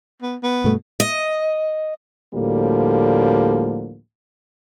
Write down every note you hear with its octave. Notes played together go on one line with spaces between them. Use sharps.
B3
B3
G2 B2 A3
D#5
D2 A2 D3 F3 G3 A#3